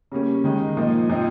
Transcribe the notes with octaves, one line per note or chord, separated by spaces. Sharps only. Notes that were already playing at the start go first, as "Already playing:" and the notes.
C#3 G3 A#3 C#4
D#3 G#3 D#4
A#2 F3 A#3 D#4
A#2 F3 C4 D#4